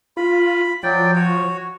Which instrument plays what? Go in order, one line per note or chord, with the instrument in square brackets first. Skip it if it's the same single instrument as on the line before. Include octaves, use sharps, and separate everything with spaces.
[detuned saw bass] F4 [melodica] B5
[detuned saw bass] F3 [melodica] F#3 D5 G5
[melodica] F#4 C#5